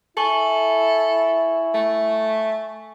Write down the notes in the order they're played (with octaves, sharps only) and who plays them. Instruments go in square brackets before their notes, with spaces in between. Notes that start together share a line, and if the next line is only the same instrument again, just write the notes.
[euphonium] E4 [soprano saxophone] A4 [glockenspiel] G#5 C#6 F#7
[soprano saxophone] A3